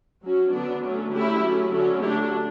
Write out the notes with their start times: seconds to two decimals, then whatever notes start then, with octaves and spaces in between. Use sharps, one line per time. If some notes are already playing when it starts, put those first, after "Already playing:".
0.22 F#3 C#4 F#4
0.52 D3 F#3 B3 D4
0.82 D3 F#3 A3 C#4
1.12 D3 A3 C#4 E4 G4
1.42 F#3 A3 C#4
1.72 D3 F#3 C#4
2.02 F#3 A3 D4 E4 G4